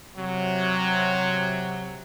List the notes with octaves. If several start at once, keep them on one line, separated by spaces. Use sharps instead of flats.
C3 F#3